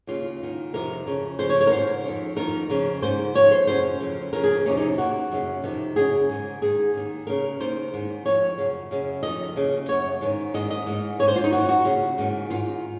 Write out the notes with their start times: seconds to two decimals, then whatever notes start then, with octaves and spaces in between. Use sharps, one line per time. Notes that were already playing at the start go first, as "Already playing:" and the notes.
0.07 D#2 C#3 F4
0.41 G#2 D#3
0.73 F2 C3 D#3 A#4
1.06 F2 C#3
1.39 F2 C#3 C5
1.50 C#5
1.61 C#5
1.67 A#4
1.71 G#2 D#3 C5
2.04 F2 D#3
2.36 F2 C3 D#3 A#4
2.70 F2 C#3
3.02 G#2 D#3 C5
3.35 F2 D#3 C#5
3.51 C5
3.67 F#2 C#3 C5
4.00 F2 C#3
4.33 F2 C#3 A#4
4.44 G#4
4.66 F2 C3 D#3 C#4
4.77 D#4
4.98 D#2 D#3 F#4
5.31 F#2 C#3
5.63 F2 C3 D#3
5.96 F#2 C#3 G#4
6.29 G#2 D#3
6.62 G#2 D#3 G#4
6.94 D#2 D#3
7.27 D#2 C#3 A#4
7.60 D#2 D#3 C5
7.93 G#2 D#3
8.25 F2 C3 D#3 C#5
8.58 F#2 C#3
8.91 F#2 C#3
9.23 F2 D#3 D#5
9.56 D#2 C#3
9.88 F#2 C#3 C#5
10.21 G#2 D#3
10.54 G#2 D#3 D#5
10.70 D#5
10.86 G#2 D#3
11.19 G#2 D#3 C#5
11.28 C5
11.36 F4
11.44 D#4
11.52 F#2 D#3 F#4
11.69 F#4
11.85 D#2 C#3
12.18 G#2 D#3
12.50 G#2 D#3 F4